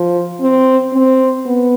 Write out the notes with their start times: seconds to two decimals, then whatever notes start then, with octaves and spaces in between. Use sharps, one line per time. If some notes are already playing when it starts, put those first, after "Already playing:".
Already playing: F3
0.41 C4
0.93 C4
1.46 B3